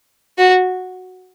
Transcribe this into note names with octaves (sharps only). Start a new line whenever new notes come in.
F#4